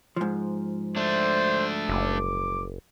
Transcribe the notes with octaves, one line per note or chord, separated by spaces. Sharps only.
G#2 F3
A3 D4 C5
F#1 D6